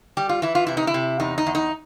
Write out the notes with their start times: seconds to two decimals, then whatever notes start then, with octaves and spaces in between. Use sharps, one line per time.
0.17 G3 G4
0.29 F4
0.42 E3 E4
0.55 F4
0.67 C3 E4
0.77 D#4
0.87 E4
0.94 C3
1.20 E2 D#4
1.38 D#4
1.46 E2
1.55 D#4